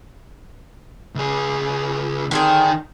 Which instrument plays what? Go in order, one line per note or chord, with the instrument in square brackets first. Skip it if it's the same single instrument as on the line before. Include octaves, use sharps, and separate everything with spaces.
[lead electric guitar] C#2 G#4
[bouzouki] D3 C4 G#4 [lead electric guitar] D#3